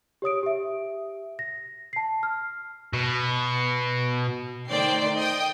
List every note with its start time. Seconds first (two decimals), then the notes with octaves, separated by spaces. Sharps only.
0.22 G4 C#5 D#6 D7
0.43 G4 E5
1.39 A#6
1.93 A5 C7
2.23 F6
2.93 B2
4.69 D#3 A3 C5 D5 G5 C7
5.17 D#5 G5 D#6